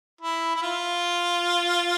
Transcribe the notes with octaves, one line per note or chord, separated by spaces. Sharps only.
E4
E4
F4